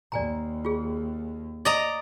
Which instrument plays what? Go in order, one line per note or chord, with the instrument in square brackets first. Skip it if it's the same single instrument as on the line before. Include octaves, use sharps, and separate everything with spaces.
[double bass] D#2 [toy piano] D5 G#5 A#5
[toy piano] F4 G#4
[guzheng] D5 D#5 A#5